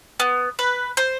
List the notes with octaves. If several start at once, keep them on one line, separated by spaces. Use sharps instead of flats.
B3
B4
C5